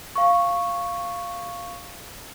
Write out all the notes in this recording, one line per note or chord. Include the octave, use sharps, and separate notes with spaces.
F5 C#6